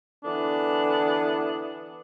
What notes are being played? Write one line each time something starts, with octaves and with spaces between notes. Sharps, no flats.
D3 E3 B3 D4